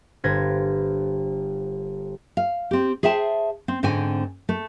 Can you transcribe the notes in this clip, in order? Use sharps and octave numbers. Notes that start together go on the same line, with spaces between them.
G1 B4 C5 G#6 A#6
F5
C4 G4
G#4 C5 E5 G5 A5
C4
G#2 D3 C4 C#5 G#5
A3